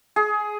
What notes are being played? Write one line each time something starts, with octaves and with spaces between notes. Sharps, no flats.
G#4